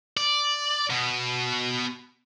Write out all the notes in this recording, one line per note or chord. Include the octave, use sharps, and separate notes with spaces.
D5
B2